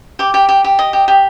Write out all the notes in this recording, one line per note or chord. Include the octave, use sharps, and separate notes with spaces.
G4 D6
G4
G4
G4
D#5
G4
G4